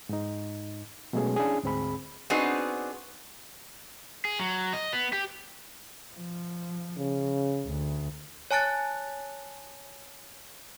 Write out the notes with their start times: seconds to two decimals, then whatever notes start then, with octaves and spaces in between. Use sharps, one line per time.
0.09 G#2 D#4
1.13 B2 F#3 G#3 A3 C#4 G#4
1.36 C#4 D4 E4 G#4
1.63 D2 G#2 C4 G#4 B5
2.30 B3 C4 D4 D#4 F#4 G#4
4.25 G#4
4.40 F#3
4.73 D#5
4.93 B3
5.13 G4
6.15 F3
6.97 C#3
7.66 D2
8.51 C#5 G#5 A5 F#6 A6